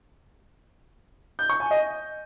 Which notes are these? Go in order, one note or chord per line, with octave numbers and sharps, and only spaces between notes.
G6
C#6
G#5
D#5